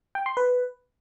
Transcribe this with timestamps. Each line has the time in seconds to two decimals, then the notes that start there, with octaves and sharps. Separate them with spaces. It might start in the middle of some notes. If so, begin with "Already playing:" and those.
0.15 G5
0.26 C6
0.37 B4